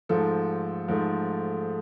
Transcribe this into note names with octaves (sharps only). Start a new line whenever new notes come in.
G#2 F3 A3 A4
G#2 F3 A3